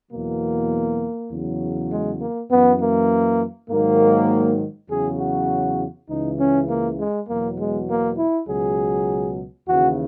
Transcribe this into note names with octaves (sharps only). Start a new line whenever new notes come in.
E2 B2 F#3 A#3
E2 C#3 F#3
G#3
A#3
F#2 E3 B3
A#3
G#2 D#3 F#3 A#3
E2 C#3 F#3 G#4
F#4
C#2 C#3 E3 D#4
C#4
A#3
G#3
E2 B2 F#3 A#3
G#3
A#3
E4
C#2 B2 F#3 G#4
D#2 C#3 E3 F#4